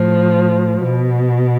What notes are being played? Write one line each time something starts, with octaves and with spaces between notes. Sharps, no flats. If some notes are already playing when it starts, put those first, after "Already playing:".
Already playing: A2 F3
B2